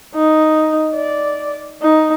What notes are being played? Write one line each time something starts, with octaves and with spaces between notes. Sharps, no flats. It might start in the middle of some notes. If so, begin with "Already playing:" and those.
D#4
D5
D#4